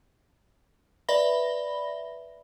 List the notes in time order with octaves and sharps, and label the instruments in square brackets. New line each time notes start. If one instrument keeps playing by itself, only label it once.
[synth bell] B4 D5 E5 B5 A#6 G7